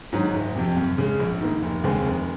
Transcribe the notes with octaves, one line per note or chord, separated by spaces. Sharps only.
G#2 D#3 F#3
F#1
F2 C3
F#2
C#3 G#3
A#1
G#2 D#3 A#3
F1
D#2 C#3 G#3 C4
F1